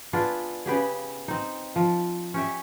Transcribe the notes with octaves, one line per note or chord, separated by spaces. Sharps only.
B3 D4 F4 G#4
C#3 B3 G4 G#4
C4 D#4
F3
C#4 G4 E5